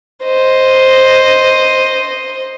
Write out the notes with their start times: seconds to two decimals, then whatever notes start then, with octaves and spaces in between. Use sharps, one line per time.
0.24 C5 D#5